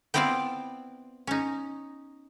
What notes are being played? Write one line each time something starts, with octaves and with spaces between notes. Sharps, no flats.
B3 C4 E4 F4 D5 F5
C#4 D#4